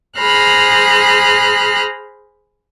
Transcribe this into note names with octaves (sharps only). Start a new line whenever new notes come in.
G#4 C5 A#5 B5 F6 F#6